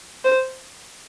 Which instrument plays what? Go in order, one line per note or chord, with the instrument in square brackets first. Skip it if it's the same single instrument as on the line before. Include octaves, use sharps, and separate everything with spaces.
[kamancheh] C5